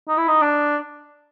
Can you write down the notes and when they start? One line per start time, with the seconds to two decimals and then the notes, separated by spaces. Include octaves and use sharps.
0.08 D#4
0.18 E4
0.28 D#4
0.42 D4